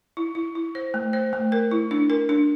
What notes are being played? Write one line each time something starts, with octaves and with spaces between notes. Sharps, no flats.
E4
E4
E4
C5
A3
C5
A3
A#4
E4
D4
A#4
D4